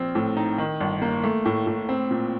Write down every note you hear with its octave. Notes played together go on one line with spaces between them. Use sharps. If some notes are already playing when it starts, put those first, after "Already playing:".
Already playing: A#1 C4
A2
D#4
D#3
G1
A#3
A3
A2
A2
C4
A#2